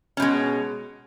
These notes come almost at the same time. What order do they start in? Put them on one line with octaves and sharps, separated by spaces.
C#4 B2 G#3